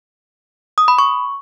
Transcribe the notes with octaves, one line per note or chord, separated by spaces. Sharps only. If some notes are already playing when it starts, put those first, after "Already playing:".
D#6
B5
C#6